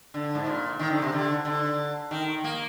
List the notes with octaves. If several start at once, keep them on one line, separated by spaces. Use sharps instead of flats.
D3
G#2
A#2
D#3
D3
C3
D3
D3
D#3
A#3